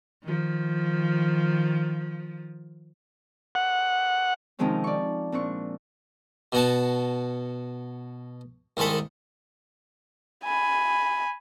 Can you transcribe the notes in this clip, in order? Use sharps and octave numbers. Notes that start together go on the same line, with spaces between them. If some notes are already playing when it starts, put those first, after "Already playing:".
D#3 F3
F#5
C3 D#3 F3 G#3 C4 C#4
D5 C#6
A#2 C4 D4 C#6
B2 F#4 A5
C2 D#3 G#3 A4 B5
G#5 B5